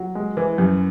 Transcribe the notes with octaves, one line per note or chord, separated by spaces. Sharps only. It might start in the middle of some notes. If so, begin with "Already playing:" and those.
Already playing: F#3
G#3
E3
F#2